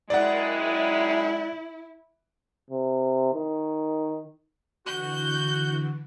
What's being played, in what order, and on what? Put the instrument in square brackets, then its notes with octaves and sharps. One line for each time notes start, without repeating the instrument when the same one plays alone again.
[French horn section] F#2 D#3 G#3 [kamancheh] E4 [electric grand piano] D5 F#5
[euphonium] C3
D#3
[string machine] D3 E3 [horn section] F#4 [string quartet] G6